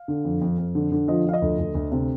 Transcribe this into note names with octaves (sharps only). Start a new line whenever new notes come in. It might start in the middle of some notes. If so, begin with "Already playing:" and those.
Already playing: F5
D3
F2
F2
F2
D3
D3
F3 D#5
F3 F5
D#5
D2
D2
D2
C3